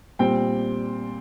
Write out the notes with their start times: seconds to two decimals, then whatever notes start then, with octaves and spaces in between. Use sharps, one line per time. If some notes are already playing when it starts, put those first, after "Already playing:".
0.19 A#2 G3 C4 G5